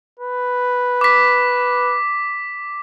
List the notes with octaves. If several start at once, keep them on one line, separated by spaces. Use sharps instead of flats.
B4
D6 B6